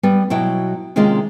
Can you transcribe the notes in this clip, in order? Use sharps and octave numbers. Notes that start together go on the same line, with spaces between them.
G3 B3
B2 F#3 E4 G5
C3 D#3 G#3 A#3 C#4 F4